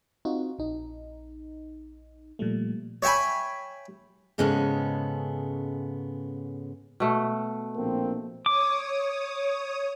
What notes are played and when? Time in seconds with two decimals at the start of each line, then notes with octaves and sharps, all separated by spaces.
0.25 C4 D#4 F4 F#4
0.59 A#1 D#4
2.39 A#2 F3 G3 A3
3.02 C#5 E5 G5 G#5 B5
4.38 G#2 C#3 G#3 B3 C#4 A4
7.00 B2 A3
7.76 A#1 A#3 C4
8.46 C#5 D6 D#6